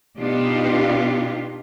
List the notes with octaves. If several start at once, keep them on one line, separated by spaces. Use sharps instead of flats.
B2 B3 D4 D#4 F4 G4